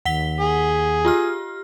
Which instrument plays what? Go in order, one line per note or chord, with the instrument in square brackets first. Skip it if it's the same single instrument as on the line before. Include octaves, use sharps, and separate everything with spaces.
[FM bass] D#2 [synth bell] F#5 B6 G7
[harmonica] G#4
[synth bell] F4 G4 F6